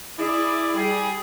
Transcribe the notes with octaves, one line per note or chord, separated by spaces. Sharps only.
E4 G#4 D5
G3 G#4